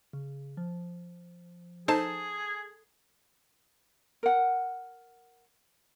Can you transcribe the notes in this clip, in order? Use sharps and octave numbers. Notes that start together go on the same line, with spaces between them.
C#3
F3
D#4 G#4 A4 C5 A5
A#4 F#5